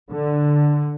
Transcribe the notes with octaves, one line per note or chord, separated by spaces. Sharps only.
D3